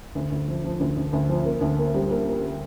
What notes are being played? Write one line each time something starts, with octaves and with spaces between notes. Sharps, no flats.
D2
D2
F3
F3
D2
D2
D2
F3
A#3
D2
A#3
G3
A#3
A#3